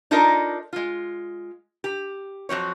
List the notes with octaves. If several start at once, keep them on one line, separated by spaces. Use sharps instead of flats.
D4 D#4 F4 A4 A#4 D#5
G#3 F4
G4
F2 F#3 C4 C#5